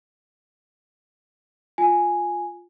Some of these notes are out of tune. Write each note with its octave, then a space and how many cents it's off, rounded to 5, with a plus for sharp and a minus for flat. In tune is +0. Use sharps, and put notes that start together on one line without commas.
F4 +10 G#5 +0